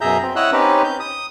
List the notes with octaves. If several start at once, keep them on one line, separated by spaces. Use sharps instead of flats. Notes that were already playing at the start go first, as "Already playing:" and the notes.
F#2 B2 G#4 E5 A#5 G6
C4
E4 C#5 D#5 F#5 E6 F#6
C4 C#4 D#4 G4 B4
G6
D#6